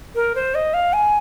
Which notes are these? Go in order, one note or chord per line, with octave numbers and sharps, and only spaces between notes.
A#4
C5
D#5
F5
G#5